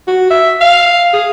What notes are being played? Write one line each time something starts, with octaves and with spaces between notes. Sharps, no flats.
F#4
E5
F5
G#4